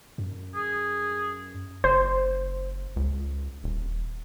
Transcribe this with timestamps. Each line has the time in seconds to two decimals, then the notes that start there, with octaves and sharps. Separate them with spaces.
0.18 F#2
0.55 G#4
1.84 F#1 C5
2.96 C#2
3.64 D#1